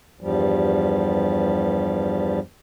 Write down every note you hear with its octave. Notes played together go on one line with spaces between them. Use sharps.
E2 G2 F3 G3